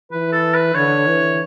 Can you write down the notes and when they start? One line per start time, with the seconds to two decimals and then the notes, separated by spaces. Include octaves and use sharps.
0.11 E3 B4
0.32 A4
0.54 B4
0.75 D3 C#5
1.07 E3